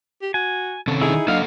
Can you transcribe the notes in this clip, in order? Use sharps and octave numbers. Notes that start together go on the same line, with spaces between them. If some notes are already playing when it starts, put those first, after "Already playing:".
G4
F#4 G#5
C3 D#3 C4 C#4 A4
D#4 E4 G#4
F#3 A#3 D4 A4 D#5 F5 F#5